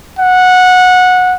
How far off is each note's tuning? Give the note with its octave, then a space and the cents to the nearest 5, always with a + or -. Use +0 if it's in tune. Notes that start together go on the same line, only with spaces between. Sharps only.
F#5 -15